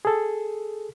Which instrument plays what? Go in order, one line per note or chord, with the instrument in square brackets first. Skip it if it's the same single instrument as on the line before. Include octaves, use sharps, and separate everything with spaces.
[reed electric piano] G#4 A4